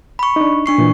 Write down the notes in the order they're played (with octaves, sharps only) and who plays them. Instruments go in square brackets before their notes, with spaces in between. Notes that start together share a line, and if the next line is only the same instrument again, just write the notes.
[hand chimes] B5 C#6
[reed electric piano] D4 D#4
[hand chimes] D4 C#6 C7
[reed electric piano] A#2 E3